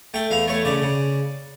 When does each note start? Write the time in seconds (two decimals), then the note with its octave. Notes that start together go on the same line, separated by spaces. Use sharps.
0.14 A3 G5
0.31 E2 F5
0.48 A3 C#5
0.65 C#3 D5
0.82 C#3